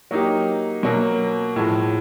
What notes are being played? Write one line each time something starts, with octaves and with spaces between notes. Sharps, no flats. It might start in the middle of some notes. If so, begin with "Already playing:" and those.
F#3 A#3 D#4 G4
B2 F#3 A#3
A2 F3 G#3